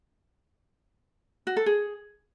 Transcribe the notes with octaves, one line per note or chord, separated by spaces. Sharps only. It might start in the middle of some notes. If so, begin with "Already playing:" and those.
F#4
A4
G#4